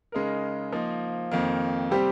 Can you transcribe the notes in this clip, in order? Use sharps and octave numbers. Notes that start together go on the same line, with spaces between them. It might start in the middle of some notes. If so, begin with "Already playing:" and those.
C#3 G#3 D#4 A#4
F3 A#3 D#4
F2 D#3 A#3
C3 G3 C4 G4